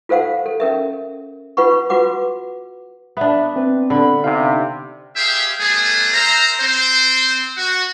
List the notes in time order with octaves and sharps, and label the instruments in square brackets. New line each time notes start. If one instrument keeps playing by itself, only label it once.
[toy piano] F4 A4 C5 F5 F#5
A4
C#4 A#4 E5
F4 B4 F#5 B5 C#6
F4 F#4 B4 F#5 D6
[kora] B3 D4 [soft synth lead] E5
[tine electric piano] C4 [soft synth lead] B4
[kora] D3 [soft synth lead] B5
[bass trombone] C3 [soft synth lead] D#4 [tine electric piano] F5
[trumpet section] G4 G#4 C5 E5 F5 G5
G3 A3 B3 G#4
A#4 C5 E5 A#5
C4 C5
F#4